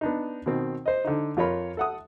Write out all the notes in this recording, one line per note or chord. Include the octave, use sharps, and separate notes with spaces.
B3 D4 D#4
B2 D#3 C4
C5 D#5
D3 D#4
F2 F4 A#4 C#5 B5
A4 F#5 D#6